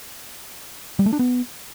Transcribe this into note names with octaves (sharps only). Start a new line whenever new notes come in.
G3
A3
D4
B3